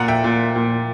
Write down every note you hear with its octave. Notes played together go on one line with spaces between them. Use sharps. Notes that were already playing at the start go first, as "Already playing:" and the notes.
Already playing: A#2 F#5 A#5
E5 G5
A#2
A#2